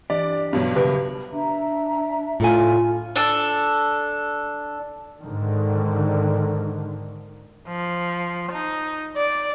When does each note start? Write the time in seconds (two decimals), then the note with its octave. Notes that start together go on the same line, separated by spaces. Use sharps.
0.10 E3 D4 G4 D5
0.53 G2 B2 F#3
0.76 C#3 G4 A#4 B4 E5
1.32 D4 E5 A#5
2.40 A2 F4 A4 G#5
3.16 D4 A4
5.22 G#2 D3 D#3
7.68 F3
8.52 D#4
9.17 D5